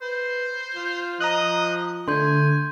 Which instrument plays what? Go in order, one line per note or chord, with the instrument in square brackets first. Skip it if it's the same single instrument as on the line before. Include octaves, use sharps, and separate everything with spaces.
[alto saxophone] B4 [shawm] C5
[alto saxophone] F4
[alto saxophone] F3 [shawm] D#5 [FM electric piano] A#5 D#6 F#6
[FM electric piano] D3 [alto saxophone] A3 [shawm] G#5 [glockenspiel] C6 G6